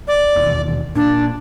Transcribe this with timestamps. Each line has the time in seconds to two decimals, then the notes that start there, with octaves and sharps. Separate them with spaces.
0.08 D5
0.36 E1 D#2
0.96 A#2 D4